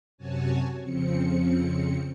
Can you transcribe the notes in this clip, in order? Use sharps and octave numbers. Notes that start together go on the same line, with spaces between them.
F#2 C3 F#4 C#5 G#5 A5
F2 C#3 F3 C4 C#7